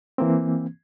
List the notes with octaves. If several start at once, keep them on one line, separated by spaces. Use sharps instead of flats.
E3 A#3 C4